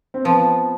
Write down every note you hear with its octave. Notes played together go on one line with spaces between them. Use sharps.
C4
F3 B3